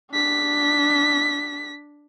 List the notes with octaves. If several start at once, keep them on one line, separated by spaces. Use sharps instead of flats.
D4 B6